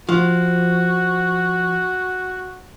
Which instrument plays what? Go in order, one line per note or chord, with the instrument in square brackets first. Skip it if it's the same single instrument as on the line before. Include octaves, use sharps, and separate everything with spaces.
[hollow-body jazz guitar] F3 [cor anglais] F#4